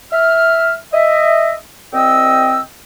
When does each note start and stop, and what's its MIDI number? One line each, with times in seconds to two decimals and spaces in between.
0.12 0.74 76
0.12 0.74 89
0.92 1.53 75
0.92 1.53 76
1.93 2.60 36
1.93 2.60 60
1.93 2.60 75
1.93 2.60 79
1.93 2.60 88